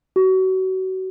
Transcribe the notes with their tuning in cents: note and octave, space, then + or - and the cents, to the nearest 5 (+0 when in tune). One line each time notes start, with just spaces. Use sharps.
F#4 +30